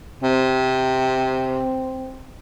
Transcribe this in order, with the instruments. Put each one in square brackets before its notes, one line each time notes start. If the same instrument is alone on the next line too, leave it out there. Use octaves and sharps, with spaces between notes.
[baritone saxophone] C3 [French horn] C4